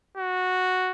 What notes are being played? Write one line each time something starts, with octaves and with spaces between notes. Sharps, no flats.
F#4